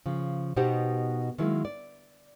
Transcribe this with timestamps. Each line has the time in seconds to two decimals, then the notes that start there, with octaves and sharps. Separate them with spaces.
0.06 C#3 F3
0.57 B2 B3 D#4 G4 C5 F#5
1.38 D#3 F#3 G#3 A#3 E4
1.65 D5